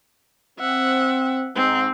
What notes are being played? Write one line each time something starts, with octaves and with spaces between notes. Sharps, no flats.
C4 E5 F#5
G#2 C4